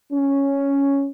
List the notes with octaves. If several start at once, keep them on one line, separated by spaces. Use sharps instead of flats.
C#4